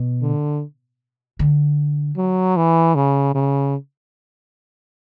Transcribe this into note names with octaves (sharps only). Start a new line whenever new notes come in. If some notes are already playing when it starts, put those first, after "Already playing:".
Already playing: B2
D3
D3
F#3
E3
C#3
C#3